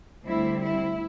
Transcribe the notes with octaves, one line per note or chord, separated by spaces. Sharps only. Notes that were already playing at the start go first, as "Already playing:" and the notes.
D2 D3 G3 C4 E4
E4